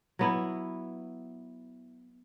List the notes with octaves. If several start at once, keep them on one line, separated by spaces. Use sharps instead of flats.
F#3 B3 E4